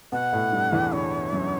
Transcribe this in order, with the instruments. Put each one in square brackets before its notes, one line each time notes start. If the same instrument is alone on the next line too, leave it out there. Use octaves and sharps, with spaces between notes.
[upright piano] B2 B3 [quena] F#5
[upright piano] A2 A3
G2 G3
E2 E3
[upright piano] D3 [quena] C#5
[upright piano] F#2 F#3